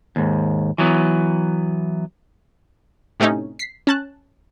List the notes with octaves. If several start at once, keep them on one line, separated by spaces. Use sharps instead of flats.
D#2 G#2
E3 F#3 B3
A2 C3 A3 C#4 D#4
B6 C7
C#4 A5 F#6